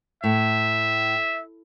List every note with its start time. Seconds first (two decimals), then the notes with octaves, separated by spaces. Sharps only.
0.24 A2 E5